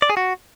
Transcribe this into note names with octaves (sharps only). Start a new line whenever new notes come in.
D5
G#4
F#4